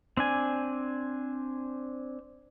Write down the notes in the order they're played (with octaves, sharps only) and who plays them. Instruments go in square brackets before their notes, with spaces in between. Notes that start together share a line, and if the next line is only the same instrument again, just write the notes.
[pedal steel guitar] C4 D4 G#5